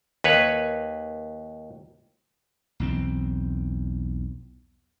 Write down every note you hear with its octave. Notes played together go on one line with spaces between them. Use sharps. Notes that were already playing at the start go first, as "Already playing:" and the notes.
D#2 B4 C#5
B1 E2 C4